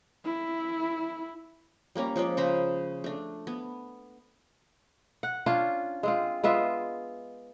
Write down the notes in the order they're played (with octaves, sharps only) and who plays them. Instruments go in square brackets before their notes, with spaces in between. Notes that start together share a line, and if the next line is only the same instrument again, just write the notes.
[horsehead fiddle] E4
[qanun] G3 A#3 C#4 A#5
F3 G#3 C#4 D5
C#3 C5 A#5 B5
A3 D4
B3
[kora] F#5
C#4 D4 F4
G#3 C4 F4
G#3 B3 F4 E5